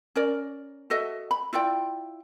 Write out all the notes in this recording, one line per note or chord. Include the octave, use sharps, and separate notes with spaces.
C#4 A#4 D5
F#4 A4 D#5 E5
B5
E4 F4 D5 G5